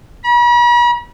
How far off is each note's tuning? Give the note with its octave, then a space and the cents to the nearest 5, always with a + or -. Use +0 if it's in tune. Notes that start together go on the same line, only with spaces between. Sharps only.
B5 -45